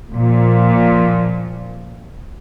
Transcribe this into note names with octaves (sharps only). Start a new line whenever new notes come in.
A#2 F3